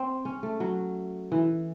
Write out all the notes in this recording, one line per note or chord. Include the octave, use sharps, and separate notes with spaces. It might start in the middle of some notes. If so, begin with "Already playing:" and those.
Already playing: C4
C#4
A3
F#3
E3